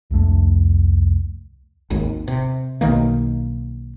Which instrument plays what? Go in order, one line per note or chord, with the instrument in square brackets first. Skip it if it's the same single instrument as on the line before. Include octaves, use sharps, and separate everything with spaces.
[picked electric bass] C2 F2 A3 D4
[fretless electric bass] G#1 D#2
C3
B1 D#3 A#3